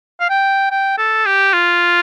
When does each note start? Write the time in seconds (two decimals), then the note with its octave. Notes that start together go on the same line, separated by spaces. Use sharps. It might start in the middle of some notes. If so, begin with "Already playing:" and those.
0.20 F5
0.30 G5
0.71 G5
0.98 A4
1.26 G4
1.53 F4